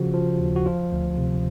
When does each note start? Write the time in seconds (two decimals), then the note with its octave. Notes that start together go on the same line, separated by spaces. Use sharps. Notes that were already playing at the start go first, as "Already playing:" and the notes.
Already playing: C#3 F3 F#4
0.14 F3
0.40 D#2
0.56 F#4
0.66 F3 F4
0.92 D2
1.18 C3